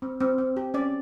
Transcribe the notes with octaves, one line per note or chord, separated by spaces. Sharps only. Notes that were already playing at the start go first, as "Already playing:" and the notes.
C4
C4
C4
G4
C#4 D5